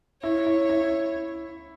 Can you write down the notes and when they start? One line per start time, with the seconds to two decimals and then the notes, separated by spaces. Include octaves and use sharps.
0.22 E4 C#5
0.46 E4
0.69 E4